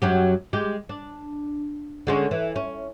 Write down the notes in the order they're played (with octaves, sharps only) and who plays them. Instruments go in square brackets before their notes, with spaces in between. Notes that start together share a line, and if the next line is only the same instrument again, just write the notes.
[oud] F#2 F#3 G4
G#3 G4
D4
D3 G#3 C#4
E3
C#4